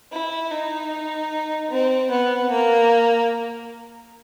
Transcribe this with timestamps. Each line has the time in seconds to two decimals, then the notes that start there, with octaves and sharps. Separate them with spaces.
0.12 E4
0.51 D#4
1.71 C4
2.10 B3
2.51 A#3